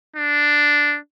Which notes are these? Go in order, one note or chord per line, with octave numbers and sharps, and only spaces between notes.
D4